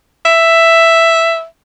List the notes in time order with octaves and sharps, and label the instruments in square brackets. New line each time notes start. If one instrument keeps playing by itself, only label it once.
[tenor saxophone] E5